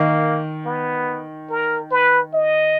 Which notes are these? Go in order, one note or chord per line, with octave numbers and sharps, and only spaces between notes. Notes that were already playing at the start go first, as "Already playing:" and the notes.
Already playing: D#3 A#3
B3
A#4
B4
D#5